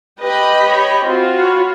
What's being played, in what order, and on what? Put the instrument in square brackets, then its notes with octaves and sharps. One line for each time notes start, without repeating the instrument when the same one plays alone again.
[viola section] G4 D#5 B5 [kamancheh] B4 G5
[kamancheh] C#5 G5
[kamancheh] C4 [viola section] F4 F#4
[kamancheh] C#5 B5